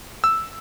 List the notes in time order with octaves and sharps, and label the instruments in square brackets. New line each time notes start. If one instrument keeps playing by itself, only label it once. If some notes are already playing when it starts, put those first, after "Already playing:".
[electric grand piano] E6